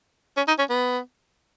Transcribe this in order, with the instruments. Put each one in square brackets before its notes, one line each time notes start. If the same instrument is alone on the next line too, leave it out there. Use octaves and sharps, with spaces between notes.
[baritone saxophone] C#4
D#4
C#4
B3